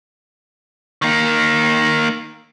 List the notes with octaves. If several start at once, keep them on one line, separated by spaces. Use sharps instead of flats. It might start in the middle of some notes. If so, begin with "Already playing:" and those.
D#3 A#3